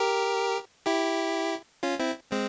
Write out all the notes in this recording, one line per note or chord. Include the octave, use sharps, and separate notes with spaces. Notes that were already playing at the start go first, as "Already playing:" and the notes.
Already playing: G4 A#4
E4 G4
C#4 F4
C4 E4
G#3 C4